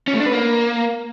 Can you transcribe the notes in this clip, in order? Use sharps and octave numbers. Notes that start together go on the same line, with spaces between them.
C#4
A3
D4
B4
A#3